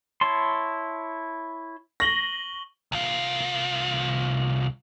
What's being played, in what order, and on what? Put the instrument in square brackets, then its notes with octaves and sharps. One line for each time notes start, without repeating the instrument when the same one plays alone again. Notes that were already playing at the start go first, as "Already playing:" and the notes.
[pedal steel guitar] E4 C#5 A5 C6
[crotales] C#6 F#7 G7 [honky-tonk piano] A#6
[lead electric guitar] C2 F4